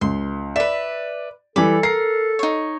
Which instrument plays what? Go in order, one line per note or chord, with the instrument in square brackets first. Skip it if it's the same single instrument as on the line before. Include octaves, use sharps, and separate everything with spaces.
[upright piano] C#2 [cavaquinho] C6
[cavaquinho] B4 E5 [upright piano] D5
[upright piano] E3 G3 [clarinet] A4 [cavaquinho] B5 D6
[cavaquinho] A#4 [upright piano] C7
[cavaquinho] D#4 C#5